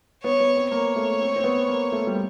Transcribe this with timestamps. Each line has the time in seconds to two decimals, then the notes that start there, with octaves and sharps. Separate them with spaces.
0.23 B3 C#5
0.40 B3
0.56 C4
0.72 A#3 C#5
0.96 A3
1.21 C4
1.36 C4
1.44 B3
1.68 A#3
1.92 A3
2.07 G3